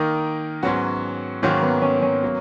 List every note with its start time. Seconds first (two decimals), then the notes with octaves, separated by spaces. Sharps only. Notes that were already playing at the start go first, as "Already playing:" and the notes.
Already playing: D#3 A#3 D#4 A#4
0.63 G#2 F#3 B3 C#4 F#4
1.42 G#2 D#3 F#3 A#3 C#4
1.62 B3
1.82 C#4
2.02 C#4
2.23 F#3 A#3